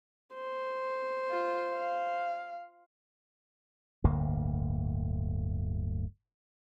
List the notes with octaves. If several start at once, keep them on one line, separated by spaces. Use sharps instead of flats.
C5
F4
F5
D1 G1 D2 A#3